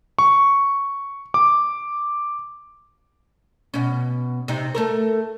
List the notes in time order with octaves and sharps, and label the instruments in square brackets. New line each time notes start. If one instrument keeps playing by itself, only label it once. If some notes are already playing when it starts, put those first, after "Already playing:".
[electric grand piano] C#6
D6
[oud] B2 C#4
C3 D#4
A3 A4 A#4